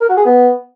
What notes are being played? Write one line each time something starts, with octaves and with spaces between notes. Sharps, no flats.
A#4
F#4
G#4
B3